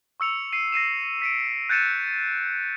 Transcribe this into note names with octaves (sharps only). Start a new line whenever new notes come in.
C#6 E6 C#7 F7
C7 D#7
A#6 C7 D#7 E7
B6 C#7 D7
F#6 G6 A6 C#7 D#7 E7